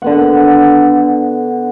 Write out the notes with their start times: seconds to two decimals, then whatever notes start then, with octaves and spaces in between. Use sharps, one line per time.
0.02 D3 B3 F#5